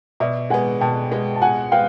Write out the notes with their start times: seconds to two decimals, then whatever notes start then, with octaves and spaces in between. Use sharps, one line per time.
0.20 B2 D5 E5
0.50 G#3 B3 F#5 G#5
0.81 B2 G5 A5
1.12 G#3 B3
1.36 A5
1.42 B2 F#5 G#5
1.72 G#3 B3 F5 G5